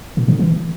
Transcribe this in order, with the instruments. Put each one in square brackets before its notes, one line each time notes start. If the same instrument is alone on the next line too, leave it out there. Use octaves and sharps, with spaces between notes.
[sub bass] A#2
D3
E3